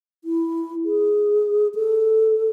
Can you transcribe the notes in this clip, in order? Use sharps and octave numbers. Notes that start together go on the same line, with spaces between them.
E4
G#4
A4